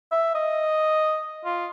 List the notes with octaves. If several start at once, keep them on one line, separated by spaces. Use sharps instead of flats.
E5
D#5
F4